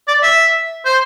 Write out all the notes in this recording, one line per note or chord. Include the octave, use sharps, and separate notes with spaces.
D5
E5
C5